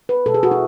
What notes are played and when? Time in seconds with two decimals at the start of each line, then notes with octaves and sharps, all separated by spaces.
0.09 B4
0.26 B2 G#3 A4
0.34 G#4
0.43 F#4
0.51 E4